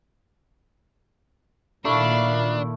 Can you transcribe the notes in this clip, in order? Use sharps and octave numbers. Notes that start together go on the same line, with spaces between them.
A#2 D#3 A3 D4 E4 F5 B5